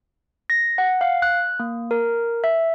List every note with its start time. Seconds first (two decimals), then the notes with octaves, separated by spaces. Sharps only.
0.50 A#6
0.78 F#5
1.01 F5
1.22 F#6
1.59 A#3
1.91 A#4
2.44 E5